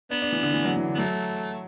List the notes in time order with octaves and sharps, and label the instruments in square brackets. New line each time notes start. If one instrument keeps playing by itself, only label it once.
[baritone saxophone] B3 [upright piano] D4
[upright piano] D4
E3
D3
E3
F#3
E3
D3
[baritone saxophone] B3
[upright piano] F#3 [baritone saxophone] A3